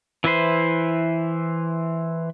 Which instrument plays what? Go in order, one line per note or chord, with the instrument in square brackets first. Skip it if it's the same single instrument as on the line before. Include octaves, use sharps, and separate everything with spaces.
[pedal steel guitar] E3 E4 B4 C5